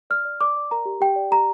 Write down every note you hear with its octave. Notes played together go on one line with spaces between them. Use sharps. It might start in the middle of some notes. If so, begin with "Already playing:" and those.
D5 F6
D5
D5 D6
D5
A#4 A#5
G4
G4 G5
D5
G4 A#5